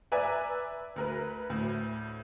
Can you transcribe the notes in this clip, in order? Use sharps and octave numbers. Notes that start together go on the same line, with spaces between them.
B4 D5 E5 G#5 A#5
D2 A#4 B4
D2 A2